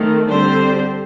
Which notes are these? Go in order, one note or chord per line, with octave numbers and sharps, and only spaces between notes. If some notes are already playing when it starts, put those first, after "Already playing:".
Already playing: D#3 A3 C4
D3 G3 C4 G4 C5